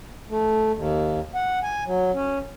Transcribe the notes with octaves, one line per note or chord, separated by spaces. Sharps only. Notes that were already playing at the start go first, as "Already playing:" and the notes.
A3
D#2
F#5
G#5
F#3
C#4